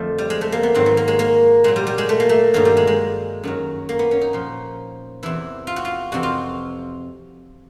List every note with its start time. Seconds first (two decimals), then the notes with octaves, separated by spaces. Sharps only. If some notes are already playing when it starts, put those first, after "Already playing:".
Already playing: F2 D3 F3 A3
0.18 G3
0.30 G#3
0.41 A3
0.52 A#3
0.63 B3
0.74 G#2 D#3 F#3 C4
0.86 B3
0.97 A#3
1.08 G#3
1.19 A#3
1.64 A#2 F#3 G#3
1.76 G3
1.87 G3
1.98 G#3
2.09 A3
2.20 A#3
2.29 A3
2.54 G2 D#3 F#3 A#3
2.65 G3
2.77 G#3
2.87 G#3
3.43 F#2 D#3 F#3
3.89 A#3
3.99 B3
4.11 C#4
4.21 D#4
4.33 A#2 F3
5.23 E2 C3 E3 E4
5.67 F4
5.76 F#4
5.85 F4
6.12 F2 C3 E3 F#4
6.23 F4